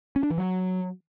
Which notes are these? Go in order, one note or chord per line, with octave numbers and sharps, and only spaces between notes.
C#4
D4
E3
F#3